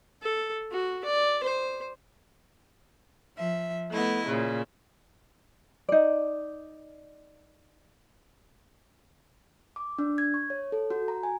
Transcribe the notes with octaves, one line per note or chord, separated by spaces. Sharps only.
A4
F#4
D5
C5
F3 E5
A3 B3 E4 D#5
A#2 C#3
D#4 D5
D6
D4
G#6
C#6
C#5
A4
F#4
A#5
G#5